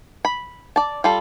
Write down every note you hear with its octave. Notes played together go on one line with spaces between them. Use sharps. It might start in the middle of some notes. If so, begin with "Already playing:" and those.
B5
D5 A5
G3 F4 A4